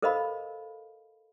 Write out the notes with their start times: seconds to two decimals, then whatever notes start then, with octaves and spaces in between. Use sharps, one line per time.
0.02 A4 A#4 C5 D#5 F5 B5